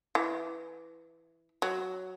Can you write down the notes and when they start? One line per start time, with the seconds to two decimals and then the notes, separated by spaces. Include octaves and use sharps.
0.15 E3
1.62 F#3